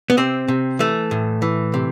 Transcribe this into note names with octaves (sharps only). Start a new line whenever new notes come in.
B3
C3 C4
C3
E3 A3
A2
E3
C3